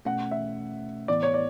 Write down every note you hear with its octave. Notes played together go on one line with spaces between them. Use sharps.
B2 A3 C#4 F#5
E5
A2 E3 B3 D5
C#5
D5